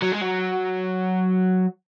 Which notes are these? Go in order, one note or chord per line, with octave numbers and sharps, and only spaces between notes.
F#3
G#3
F#3